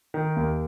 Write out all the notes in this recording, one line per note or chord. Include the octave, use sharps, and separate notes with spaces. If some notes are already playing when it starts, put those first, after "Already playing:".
D#3
D#2